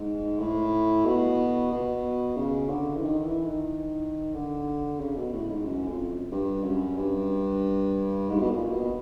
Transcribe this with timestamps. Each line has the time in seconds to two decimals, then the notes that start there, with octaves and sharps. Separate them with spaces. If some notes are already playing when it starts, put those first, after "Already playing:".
Already playing: G#2
0.39 A2
1.05 B2
1.72 B2
2.37 C#3
2.69 D3
2.96 E3
3.03 D#3
3.24 E3
3.46 D#3
4.34 D3
5.00 C#3
5.15 B2
5.33 A2
5.49 G#2
5.65 F#2
5.87 F2
6.32 G2
6.63 F#2
6.97 G2
8.29 G#2
8.40 B2
8.50 A#2
8.71 B2